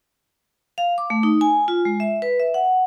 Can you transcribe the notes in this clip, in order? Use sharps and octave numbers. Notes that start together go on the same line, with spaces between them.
F5
D6
A3
D#4
G#5
F4
G#3
E5
B4
E5
F#5